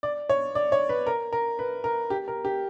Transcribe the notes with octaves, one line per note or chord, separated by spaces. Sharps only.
D5
C#5
D5
C#5
B4
A#4
A#4
B4
A#4
G4
A#4
G4